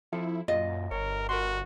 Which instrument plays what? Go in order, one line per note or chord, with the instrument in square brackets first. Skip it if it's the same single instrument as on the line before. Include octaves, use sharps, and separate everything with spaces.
[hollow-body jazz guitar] F2 F3 A4 [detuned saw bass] E4
[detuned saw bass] F#2 [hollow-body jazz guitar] A#2 F4 [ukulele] D#5
[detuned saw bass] G1 [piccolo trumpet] A#4 [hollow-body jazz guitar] C#5
[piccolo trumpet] F#4 [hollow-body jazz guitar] A#4 C6